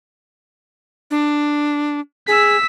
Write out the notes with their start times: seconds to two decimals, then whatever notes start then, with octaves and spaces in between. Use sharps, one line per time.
1.11 D4
2.28 G#4 E6 B6